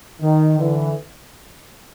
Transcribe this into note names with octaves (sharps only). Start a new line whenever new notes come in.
D#3
D3 E3